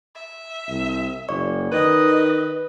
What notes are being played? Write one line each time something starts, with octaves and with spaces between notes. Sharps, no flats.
E5
C2
F#1 D5 C#6
D#3 B4 D#5